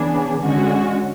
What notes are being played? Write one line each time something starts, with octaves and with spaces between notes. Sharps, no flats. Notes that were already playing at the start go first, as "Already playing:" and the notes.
Already playing: C#3 E3 B3 D4 G#4
D3 G#3 C#4 F#4